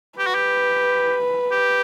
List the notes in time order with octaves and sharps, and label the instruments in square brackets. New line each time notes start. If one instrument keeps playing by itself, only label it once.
[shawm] G4 [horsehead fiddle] B4
[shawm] F#4
G4
G4